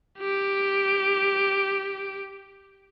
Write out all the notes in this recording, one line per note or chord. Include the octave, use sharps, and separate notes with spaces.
G4 D7